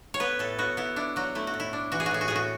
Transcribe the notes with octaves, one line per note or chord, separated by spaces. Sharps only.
C#5
B3 B4
A2 A4
B3 F#4
B3 E4
D4 E4
F#3 F#4
A3 E4
F#4
A2
E4
D4
E3 F#4
G#4
F#4
A2 G#4
F#4
A2 G#4
F#4